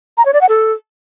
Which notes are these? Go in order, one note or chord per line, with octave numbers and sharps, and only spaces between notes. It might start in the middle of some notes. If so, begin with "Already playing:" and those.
A#5
C#5
D5
F#5
A4